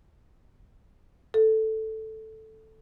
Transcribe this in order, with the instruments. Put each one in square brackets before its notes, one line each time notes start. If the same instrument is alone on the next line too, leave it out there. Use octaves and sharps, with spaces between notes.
[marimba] A4